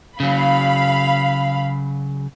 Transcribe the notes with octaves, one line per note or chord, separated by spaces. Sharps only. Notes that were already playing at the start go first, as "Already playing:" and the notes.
C#3 F#3 F5 B5